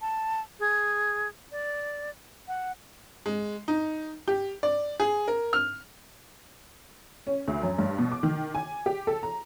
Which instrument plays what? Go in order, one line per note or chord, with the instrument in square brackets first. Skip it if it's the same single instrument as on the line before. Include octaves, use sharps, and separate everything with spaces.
[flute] A5
G#4
D5
F#5
[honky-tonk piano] G#3
D#4
G4
D5
G#4
A#4
F6
C#4
D2
F#2
G2
B2
D6
D#3
G#5
G4
A4
A#5